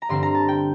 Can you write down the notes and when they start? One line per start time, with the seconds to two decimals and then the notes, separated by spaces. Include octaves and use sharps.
0.02 A#5
0.09 G2 D3 G3 C4 C6
0.23 A#5
0.35 A5
0.48 G5